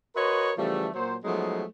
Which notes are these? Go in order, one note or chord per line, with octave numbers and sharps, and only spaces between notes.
F#4 A#4 B4 C#5 D#5 C6
C#3 E3 F3 G3 A3
A#2 F#3 C5
F3 F#3 G#3 A3 B3 D#4